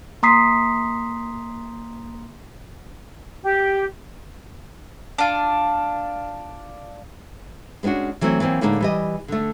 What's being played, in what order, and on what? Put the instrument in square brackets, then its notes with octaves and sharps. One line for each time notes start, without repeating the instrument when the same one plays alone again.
[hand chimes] A#3 A#5 C6 D#6 B6 C7
[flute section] G4
[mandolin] D4 F4
[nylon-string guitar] G#3 B3 C#4 D4 F#4
E3 F#3 A3 C4 E4
E3 F#3 A#3 C4
A2 D3 G#3 A#3 C#4 D#4
E3 G3 D#5
D3 A3